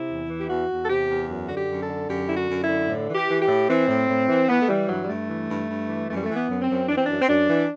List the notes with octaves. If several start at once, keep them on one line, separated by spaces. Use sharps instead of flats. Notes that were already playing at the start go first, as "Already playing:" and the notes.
Already playing: C3 E4
E2
E3
G4
E2 F#4
E2
A4
C3 G4
E2
F#2
D3 F#4
G4
F#2
A4
D3
F#2 G4
D3 E4
F#4
F#2
E4
D3
A2
E3
G4
E3
G4
A2
E3 C4
A2
A2
E3
E3 B3
A3
E3 G3
G2 F#3
G3
G2 A3
E3
G2
G2
E3
F#2 A3
G3
E3 A3
B3
F#2
C4
F#2
E3 D4
C4
F#2 D4
C4
F#2 D4
E3